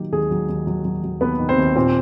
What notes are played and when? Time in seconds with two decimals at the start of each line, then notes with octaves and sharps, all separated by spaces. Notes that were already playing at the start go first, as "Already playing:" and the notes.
Already playing: D#3 F#3 A#3 G4
0.12 D#2 G#3 G#4
0.31 F#3
0.49 D#2
0.67 F#3
0.85 F#3
1.03 F#3
1.21 D#2 B3 B4
1.39 D#3
1.49 C4 C5
1.58 D#2
1.75 A#2 C4 C5